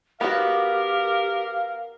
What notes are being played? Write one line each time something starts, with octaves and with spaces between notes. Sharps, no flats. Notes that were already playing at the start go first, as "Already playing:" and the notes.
B3 F#4 G4 A#4 F5